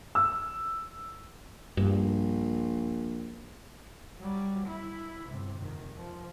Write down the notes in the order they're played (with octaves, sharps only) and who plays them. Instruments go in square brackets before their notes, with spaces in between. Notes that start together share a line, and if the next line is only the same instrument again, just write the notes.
[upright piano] E6
[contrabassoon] A#1 [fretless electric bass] G2
[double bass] F#3 G3
E4
G1 C3
F1 D#3
F3